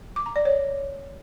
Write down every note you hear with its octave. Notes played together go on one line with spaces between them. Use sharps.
D6
A#5
D5
C#5